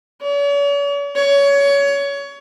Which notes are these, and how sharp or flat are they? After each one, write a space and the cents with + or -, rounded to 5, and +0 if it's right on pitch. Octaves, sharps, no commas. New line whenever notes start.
C#5 +45
C#5 +25